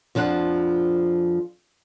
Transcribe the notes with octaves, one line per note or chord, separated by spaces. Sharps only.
F2 F3 D4 A4 F#5